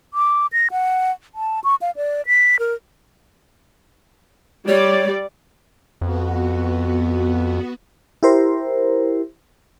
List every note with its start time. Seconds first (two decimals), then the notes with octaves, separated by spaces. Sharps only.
0.14 D6
0.53 A#6
0.71 F#5
1.35 A5
1.64 C#6
1.82 F5
1.96 D5
2.27 B6
2.59 A#4
4.68 G3 C#5 D5
6.01 F2 B3 F#4
8.23 E4 G4 A#4 C5